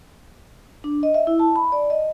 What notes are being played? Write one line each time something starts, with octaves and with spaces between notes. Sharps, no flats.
D4
D#5
E5
E4
A5
B5
D5
D#5